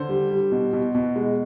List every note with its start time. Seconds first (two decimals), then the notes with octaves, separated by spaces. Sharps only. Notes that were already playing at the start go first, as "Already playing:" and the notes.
Already playing: D3 C5
0.09 G3
0.30 G3
0.52 B2
0.73 B2
0.95 B2
1.16 G#3